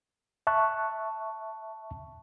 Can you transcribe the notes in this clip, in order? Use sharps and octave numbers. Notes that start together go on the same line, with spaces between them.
E5 A5 C#6 F#6